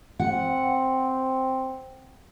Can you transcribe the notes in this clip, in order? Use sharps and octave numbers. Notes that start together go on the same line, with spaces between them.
C4 F#5